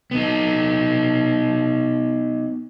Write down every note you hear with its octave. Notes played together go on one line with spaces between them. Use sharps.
B3 D#4